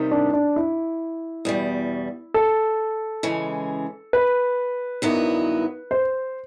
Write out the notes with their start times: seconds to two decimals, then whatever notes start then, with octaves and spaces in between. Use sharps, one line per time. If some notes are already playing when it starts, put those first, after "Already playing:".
Already playing: C3 D#3 G3
0.11 D4
0.33 D4
0.56 E4
1.45 E2 B2 G3
2.34 A4
3.23 C#3 E3 G#3
4.13 B4
5.02 G2 D#3 F#3 B3 E4
5.91 C5